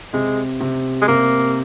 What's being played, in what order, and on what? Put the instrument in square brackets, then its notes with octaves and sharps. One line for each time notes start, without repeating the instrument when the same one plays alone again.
[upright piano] C3 [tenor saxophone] G#3
[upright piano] C3
[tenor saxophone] G#3
[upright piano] C3 [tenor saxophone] A#3